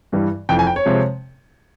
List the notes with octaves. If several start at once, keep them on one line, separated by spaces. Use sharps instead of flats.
G2 E3 G3
F1 F2 E3 G5
G#5
G5
C#5
C3 F3 G#3